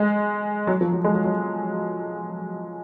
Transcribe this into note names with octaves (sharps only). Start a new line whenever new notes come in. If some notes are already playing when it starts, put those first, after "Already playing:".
Already playing: G#3
F#3
F3
F#3
G#3
F#3
F#3